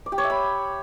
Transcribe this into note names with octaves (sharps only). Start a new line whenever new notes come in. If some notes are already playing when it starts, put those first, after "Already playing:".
D5
G4
C#5
E5
B5